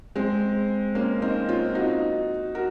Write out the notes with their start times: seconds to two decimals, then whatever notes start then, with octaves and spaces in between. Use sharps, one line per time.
0.16 G#3 C4
0.95 A#3 C#4
1.22 C4 D#4
1.49 C#4 F4
1.75 D#4 F#4
2.55 F#4 A#4